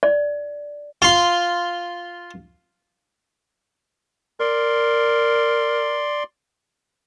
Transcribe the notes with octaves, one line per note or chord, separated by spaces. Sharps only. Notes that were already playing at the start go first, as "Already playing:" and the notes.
D5
F4 C6
A#4 D5 C6